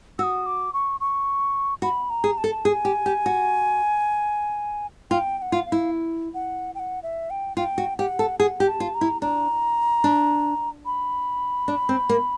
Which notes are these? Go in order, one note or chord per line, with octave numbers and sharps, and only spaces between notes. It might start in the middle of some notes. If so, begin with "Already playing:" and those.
F#4 D#6 E6
D6
C#6
C#6
F#4 B5
A#5
G#4
A5
A4
G#4 G#5
G4
G4
F#4
F4 G5
G5
F#5
F4
F5
E4
F#5
G5
F#5
E5
G5
F4 G5
F#4
G4 F#5
A4
G#4 F#5
G4
A5
F4
A#5
E4
D4 A#5
D4
B5
D4
C4
A#3